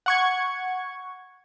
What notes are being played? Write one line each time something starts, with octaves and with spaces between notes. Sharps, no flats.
F#5 C#6 G#6